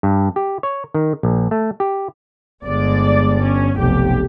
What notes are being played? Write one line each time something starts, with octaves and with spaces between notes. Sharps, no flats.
G2
G4
C#5
D#3
A#1
A3
G4
G1 G#3 D5
C#4
F1 B1 G4